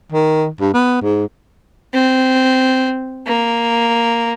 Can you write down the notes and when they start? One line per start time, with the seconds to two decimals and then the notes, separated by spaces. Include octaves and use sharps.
0.12 D#3
0.60 G2
0.73 B3
1.02 G#2
1.94 C4
3.27 A#3